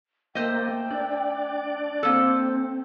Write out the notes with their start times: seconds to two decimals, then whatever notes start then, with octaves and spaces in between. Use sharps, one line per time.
0.35 A3 A#3 C5 D#5 G5
0.91 D4 D5
2.03 A#3 C4 A4